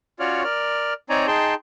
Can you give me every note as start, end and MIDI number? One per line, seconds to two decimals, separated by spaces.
0.20 0.43 61
0.20 0.43 65
0.20 0.43 66
0.20 0.43 73
0.20 0.43 74
0.20 0.43 89
0.44 0.94 70
0.44 0.94 74
0.44 0.94 89
1.10 1.27 60
1.10 1.27 63
1.10 1.27 73
1.10 1.27 74
1.10 1.27 80
1.10 1.27 82
1.27 1.54 63
1.27 1.54 68
1.27 1.54 79
1.27 1.54 81
1.27 1.54 84